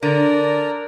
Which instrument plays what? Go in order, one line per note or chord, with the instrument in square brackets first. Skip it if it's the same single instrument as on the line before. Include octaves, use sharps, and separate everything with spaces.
[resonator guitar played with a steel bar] D3 [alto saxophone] A#4 [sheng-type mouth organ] D5 A#5